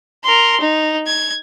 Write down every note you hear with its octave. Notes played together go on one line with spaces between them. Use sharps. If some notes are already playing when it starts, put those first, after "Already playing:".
A#4 C6
D#4
G#6